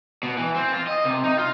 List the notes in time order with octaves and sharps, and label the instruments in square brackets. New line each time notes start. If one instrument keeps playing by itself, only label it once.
[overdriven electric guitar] B2
E3
C4
F4
D#5
C3
D#4
F4